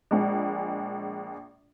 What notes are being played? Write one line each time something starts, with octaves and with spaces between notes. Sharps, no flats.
A#1 G#3